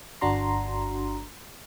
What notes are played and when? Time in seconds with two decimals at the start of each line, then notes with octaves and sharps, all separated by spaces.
0.21 G1 D4 F#4 A#5 C6